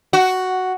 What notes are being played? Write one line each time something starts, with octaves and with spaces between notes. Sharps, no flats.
F#4